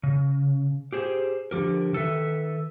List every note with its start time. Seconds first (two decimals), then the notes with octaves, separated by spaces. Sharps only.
0.03 C#3
0.93 G4 G#4 C5
1.51 D3 F3 G4 A#4
1.93 D#3 A4 B4 E5